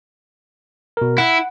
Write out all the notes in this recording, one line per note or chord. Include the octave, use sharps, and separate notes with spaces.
B2 A#4
E4 F#5